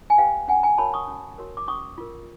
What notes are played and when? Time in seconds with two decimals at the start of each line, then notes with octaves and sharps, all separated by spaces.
0.10 G#5
0.18 G4 B4 F5 G5
0.48 C#4 F#5 G#5
0.63 G#5 A#5
0.78 F#4 A#4 C#5 A5 B5
0.93 C#6 D#6
1.08 C#4
1.38 F#4 A#4 C#5
1.57 D6
1.67 C#4 C#6 D#6
1.98 F4 A#4